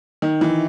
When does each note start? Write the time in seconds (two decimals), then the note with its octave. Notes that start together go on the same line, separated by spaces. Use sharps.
0.22 D#3
0.41 E3